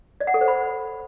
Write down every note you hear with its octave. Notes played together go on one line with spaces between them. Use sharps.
D5
F#5
A4
C5
B5